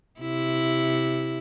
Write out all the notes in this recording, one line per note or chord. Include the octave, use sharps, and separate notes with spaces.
C3 E4